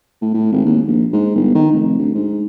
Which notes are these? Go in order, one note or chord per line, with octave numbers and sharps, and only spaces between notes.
A2
A2
G#1
D#2
A#1
G#2
G1
D#3
F1
D2
G#2